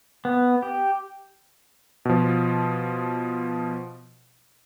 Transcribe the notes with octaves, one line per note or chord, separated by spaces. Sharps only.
B3
G4
B2 F3